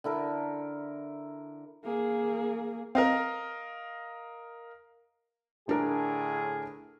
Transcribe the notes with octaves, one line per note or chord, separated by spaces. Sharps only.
D3 E4 A4 A#4
A#3 G#4
C4 A#4 D#5 F5
A2 D3 D4 G#4 A#4